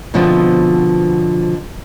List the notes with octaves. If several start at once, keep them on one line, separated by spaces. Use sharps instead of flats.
B2 D3 F3 B3 C4